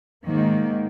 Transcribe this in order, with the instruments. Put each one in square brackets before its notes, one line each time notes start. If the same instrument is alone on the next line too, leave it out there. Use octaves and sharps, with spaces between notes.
[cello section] G#2 D#3 A#3